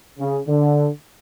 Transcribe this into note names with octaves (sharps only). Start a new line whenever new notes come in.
C#3
D3